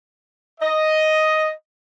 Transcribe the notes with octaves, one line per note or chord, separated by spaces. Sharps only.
D#5